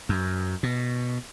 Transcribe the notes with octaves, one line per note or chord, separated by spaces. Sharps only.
F#2
B2